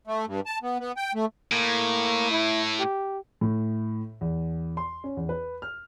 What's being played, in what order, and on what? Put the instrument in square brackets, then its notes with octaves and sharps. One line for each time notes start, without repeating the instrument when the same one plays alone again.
[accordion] A3
G2
A5
B3
B3
G5
A3
[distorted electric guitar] A2 [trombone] A#3
[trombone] E4
G4
[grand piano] A2
E2
C6
C#4
E2
B4
F6